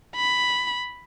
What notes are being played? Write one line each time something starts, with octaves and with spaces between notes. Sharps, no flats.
B5